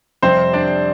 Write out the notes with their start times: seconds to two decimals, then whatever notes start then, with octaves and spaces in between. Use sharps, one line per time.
0.22 F2 C3 G3 C4 C5
0.53 D4 D5